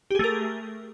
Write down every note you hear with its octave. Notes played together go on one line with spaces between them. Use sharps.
A3 G4 G#4 A#4